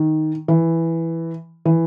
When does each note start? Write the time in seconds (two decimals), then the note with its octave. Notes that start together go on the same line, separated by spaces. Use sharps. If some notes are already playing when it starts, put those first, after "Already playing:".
Already playing: D#3
0.48 E3
1.65 E3